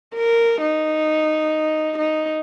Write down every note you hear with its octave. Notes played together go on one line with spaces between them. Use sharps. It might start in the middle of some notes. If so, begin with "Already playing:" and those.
A#4
D#4
D#4